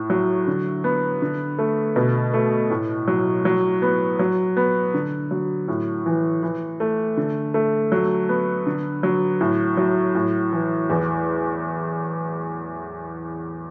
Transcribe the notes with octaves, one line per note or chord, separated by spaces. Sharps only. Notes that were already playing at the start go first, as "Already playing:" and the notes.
Already playing: A2
F#3
D3
B3
D3
A3
B2
A3
A2
F#3
F#3
B3
F#3
B3
D3
F#3
A2
E3
E3
A3
D3
A3
F#3
B3
D3
F#3
A2
F#3
A2
E3
E2